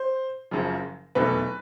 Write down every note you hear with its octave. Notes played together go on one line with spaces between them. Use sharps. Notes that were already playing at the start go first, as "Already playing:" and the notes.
Already playing: C5
F#1 F#2 C#3 F3
F1 E2 B2 F#3 A3 B4